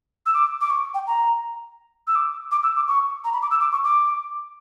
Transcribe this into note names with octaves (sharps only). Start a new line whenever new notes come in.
E6
D6
D6
C#6
G5
A#5
E6
D6
D6
E6
D6
C#6
A#5
B5
D6
E6
D6
C#6
D6